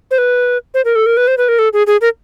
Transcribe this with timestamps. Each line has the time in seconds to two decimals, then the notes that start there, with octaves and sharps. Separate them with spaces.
0.11 C5
0.18 B4
0.74 C5
0.85 A#4
0.95 A4
1.06 A#4
1.17 B4
1.28 C5
1.38 B4
1.48 A#4
1.59 A4
1.73 G#4
1.87 G#4
2.01 A#4